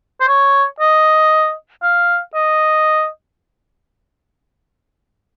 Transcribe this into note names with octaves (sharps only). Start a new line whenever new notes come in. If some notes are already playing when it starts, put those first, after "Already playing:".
C5
C#5
D#5
F5
D#5